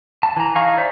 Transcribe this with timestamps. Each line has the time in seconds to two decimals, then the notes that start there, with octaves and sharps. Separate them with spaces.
0.23 A5
0.37 E3 A#5
0.55 D#4 G#4 F5 A#5 C#6
0.77 C5 D5 E5 A#5